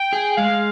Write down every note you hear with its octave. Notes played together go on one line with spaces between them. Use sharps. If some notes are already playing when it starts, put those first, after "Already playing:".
Already playing: G5
G#4
G#3 F5